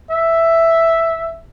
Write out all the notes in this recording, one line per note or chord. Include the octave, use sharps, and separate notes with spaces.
E5